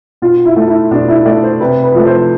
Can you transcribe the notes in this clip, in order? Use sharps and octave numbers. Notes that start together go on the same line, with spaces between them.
B2 F4
E4
A3
E4
B2 D4
E4
A3 D5
C5
C3 B4
B4
F3 A3
C5